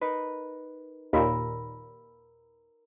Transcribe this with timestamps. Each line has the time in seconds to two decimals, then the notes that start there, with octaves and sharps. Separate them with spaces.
0.01 D#4 A#4 B4
1.13 D#2 A#2 A#4 B5 E6